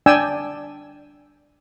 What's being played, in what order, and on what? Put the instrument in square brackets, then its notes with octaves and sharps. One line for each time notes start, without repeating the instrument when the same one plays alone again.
[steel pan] D4 D5 G5 G#5 E6